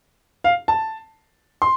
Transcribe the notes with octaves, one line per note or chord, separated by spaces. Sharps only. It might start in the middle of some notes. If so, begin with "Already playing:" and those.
F5
A5
C6